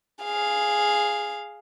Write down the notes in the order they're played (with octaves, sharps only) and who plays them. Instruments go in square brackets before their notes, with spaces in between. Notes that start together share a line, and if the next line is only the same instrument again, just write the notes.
[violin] G#4 F5